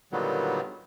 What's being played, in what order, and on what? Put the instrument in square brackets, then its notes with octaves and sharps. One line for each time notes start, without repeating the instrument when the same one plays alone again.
[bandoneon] A#2 D3 D#3 F#3 G3 B3